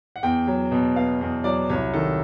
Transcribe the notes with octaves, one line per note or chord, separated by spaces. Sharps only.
F#5
E2 G5
F#3
B2
B3 F5
E2
F#3 D5
C2 C#5
D#3 A4